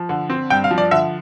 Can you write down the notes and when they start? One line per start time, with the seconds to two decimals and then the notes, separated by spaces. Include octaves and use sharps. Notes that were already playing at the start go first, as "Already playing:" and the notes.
Already playing: F3
0.09 D3
0.30 C4
0.50 G2 G5
0.64 F5
0.71 F3
0.78 D5
0.91 D3 E5